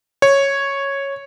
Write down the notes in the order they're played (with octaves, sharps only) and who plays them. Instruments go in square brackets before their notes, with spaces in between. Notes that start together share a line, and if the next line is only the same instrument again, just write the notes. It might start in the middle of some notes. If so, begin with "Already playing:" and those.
[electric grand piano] C#5